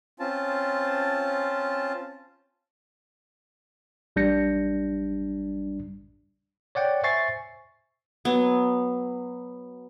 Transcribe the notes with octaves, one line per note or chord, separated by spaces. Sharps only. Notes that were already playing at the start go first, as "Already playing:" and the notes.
C4 C#4 F4 A5
A1 G3 D4 G6 A#6 C#7
C#5 D5 F#5 G5
C5 E5 G#5 C#6 A6 C7
F#3 B3